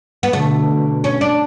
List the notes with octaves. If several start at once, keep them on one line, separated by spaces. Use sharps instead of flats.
B3
B2 D3 A3
C#4
D4